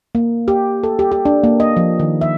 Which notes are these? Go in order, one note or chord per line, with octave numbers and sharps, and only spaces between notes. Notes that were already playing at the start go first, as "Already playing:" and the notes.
A#3
G4
A4
G4
G4
D4
A#3
D#5
F3
D#3
E5